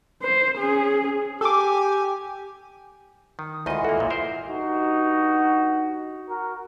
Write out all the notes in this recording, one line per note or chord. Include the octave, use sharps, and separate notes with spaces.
C5
C#4 G#4
G4 A4 G#5 D6
D#3
D#6
D2 D#3 E3 G#3 F4 D#5 F#5
A#3 F#4 A4
B1 E2 A#2
A#4 C5 E5
G2 D#4 F#4
F#4 A#4